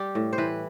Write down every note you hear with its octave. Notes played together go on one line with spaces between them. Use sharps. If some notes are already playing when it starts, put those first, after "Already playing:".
Already playing: G3 G4
A2
C5
E3 B4